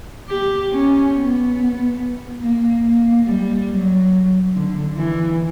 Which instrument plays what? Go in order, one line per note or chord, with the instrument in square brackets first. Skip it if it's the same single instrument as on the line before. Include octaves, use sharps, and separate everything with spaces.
[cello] G4
C#4
B3
A#3
A#3
G3
F#3
D3
E3